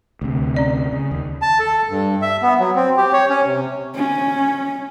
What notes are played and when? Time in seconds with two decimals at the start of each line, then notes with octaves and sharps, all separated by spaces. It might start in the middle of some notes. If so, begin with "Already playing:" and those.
0.21 D2 C3
0.54 C#4 D5 D#5
0.93 C#3
1.11 D#2
1.42 A5
1.60 A4
1.90 G2
2.22 E5
2.42 B3
2.60 F#3
2.76 C4
2.97 G4
3.13 C#5
3.30 C#4
3.46 C3
3.95 C#4